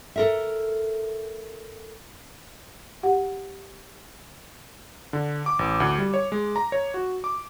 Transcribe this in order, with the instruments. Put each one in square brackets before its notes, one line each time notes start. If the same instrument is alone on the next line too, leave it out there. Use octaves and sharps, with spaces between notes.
[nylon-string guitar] A4 A#4 E5
[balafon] G4 F#5
[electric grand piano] D3
D6
A1
D2
G3
C#5
G#3
A#5
C#5
F#4
D6